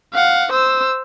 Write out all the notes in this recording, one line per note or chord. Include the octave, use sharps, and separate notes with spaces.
F5 F#5
C5 E6